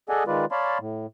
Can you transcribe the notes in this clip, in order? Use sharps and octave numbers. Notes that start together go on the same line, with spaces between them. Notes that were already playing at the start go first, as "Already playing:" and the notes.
G#4 A4 D5 D#5 F#5 G#5
D#3 G#3 F4 B4 D5
C#5 D5 F5 A5 B5 C6
A2